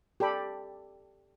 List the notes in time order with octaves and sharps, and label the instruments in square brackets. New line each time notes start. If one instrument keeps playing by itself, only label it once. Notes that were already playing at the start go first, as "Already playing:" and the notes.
[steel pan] G4 A4 D5 B5